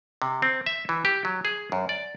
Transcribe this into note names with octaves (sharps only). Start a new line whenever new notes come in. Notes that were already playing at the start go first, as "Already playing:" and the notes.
C3
C4
E5
E3
G4
F#3
G#4
F#2
D5